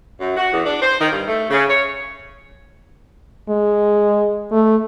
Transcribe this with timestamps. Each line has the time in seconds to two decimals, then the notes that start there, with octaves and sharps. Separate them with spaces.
0.20 F#2
0.36 F#4
0.52 E2
0.65 D4
0.82 C5
1.00 D#3
1.12 G2
1.27 A3
1.50 C#3
1.70 C#5
3.49 G#3
4.52 A3